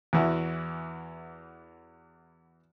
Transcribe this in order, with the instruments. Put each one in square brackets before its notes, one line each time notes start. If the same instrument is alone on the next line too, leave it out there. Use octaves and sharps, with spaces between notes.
[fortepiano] E2 E3 F#4